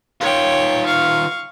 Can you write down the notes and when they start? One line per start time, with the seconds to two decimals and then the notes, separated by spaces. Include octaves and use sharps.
0.21 D#3 F4 C#5 G5
0.86 F5 C#6